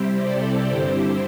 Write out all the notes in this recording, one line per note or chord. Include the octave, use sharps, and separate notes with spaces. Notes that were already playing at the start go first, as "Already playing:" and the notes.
Already playing: C3 G3 C4 E4 G4 C5
A4 D5
G2 D3 C4 E4 G4 C5